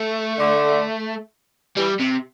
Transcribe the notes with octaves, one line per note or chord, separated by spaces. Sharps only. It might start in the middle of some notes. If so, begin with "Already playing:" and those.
Already playing: A3
D3
E3 G3
C3